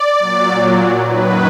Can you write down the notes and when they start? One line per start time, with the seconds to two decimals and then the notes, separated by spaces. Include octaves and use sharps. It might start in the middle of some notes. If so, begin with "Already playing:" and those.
Already playing: D5
0.19 A#2 F#3
1.03 F#2 D#3 F#3 B4